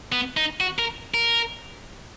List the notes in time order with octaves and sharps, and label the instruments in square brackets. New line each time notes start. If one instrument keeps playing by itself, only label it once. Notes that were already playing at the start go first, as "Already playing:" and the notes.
[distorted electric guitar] B3
D#4
F#4
A#4
A#4